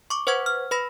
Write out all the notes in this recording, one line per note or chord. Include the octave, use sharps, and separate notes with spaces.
C#6 D6
B4 C5 F#5 C#6 G#6
F6
B4 B5 A#6